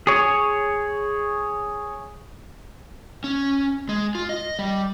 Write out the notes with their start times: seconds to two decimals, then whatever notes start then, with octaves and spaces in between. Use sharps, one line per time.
0.07 G#4 C#5
3.24 C#4
3.89 G#3
4.15 F4
4.29 D#5
4.59 G3